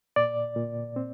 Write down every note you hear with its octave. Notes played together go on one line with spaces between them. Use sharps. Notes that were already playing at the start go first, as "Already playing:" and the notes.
A#2 D5
A#2
C4